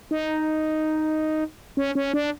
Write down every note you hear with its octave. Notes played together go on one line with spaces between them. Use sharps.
D#4
C#4
C#4
D4